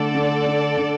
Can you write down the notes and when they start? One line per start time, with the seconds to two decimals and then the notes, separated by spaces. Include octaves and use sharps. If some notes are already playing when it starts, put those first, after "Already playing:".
Already playing: D3 A3 A4 D5
0.15 D3
0.46 D4
0.77 D3